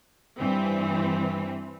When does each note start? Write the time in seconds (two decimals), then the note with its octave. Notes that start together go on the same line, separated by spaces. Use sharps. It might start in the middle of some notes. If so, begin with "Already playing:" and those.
0.38 G2 E3 C4